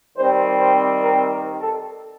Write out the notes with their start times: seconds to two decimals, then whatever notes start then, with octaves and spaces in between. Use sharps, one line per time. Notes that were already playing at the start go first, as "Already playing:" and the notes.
0.17 D#3 G3 C4 C5
0.60 C5
1.03 A#4
1.32 A#4
1.61 A4